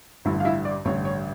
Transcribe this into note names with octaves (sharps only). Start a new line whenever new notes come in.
A1 G2 D3 E4 E5
F5
E4 E5
D5
A1 G2 D3 C#5
C#5